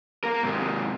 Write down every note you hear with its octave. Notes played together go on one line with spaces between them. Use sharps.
A#3 A#4
G#2 C3